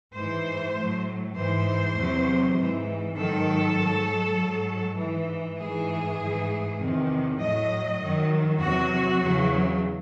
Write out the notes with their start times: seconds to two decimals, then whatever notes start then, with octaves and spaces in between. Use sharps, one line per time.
0.15 G#2 E3 C5
0.75 A2 F#3
1.36 G#2 E3 C5
1.97 E2 C3 F#3
2.56 G#2 E3
3.17 G#2 D#3 F#3 A4
3.77 G#2 F#3
4.38 G#2 F#3
4.99 G#2 E3
5.58 G#2 E3 G#4
6.19 G#2 E3
6.80 E2 C3 D#3
7.40 A2 F#3 D#5
8.00 F#2 D#3 F#3
8.60 E2 C3 F#3 F#4
9.21 E2 C#3 F#3